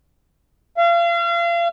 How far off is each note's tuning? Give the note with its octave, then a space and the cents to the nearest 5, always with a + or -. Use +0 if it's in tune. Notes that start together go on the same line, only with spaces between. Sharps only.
F5 -35